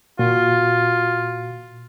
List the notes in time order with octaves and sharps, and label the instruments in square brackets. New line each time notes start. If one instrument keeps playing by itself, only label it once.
[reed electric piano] A#2 F#4 [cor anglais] F4